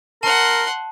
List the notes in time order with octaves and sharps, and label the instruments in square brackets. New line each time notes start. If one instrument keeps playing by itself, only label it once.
[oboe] A#4 [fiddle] F#5 C6 [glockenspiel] A5